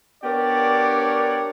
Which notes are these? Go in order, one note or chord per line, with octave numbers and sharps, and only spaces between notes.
B3 D4 G4 A#4 C#5 D5